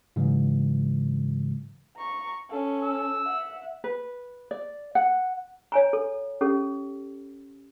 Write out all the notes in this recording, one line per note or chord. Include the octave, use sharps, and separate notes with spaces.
G#2 C#3 E3 F#3 G#3
A#5 C#6
C#4 A4
E6
E5 F#5
B4
D5
F#5
C#5 G#5 A#5
A4
C#4 G4 A4